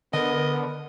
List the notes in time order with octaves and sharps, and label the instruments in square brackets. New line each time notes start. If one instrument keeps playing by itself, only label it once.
[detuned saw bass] D3 [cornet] B3 [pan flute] A#4 [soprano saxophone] D#5